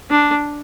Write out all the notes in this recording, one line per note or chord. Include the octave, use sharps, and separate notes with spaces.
D4